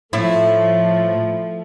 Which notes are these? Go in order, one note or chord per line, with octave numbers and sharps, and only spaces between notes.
A2 F3 A3 E4